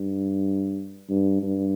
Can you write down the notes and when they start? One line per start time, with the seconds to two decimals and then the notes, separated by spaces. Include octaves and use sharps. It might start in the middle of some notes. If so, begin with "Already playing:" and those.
Already playing: G2
1.10 G2
1.42 G2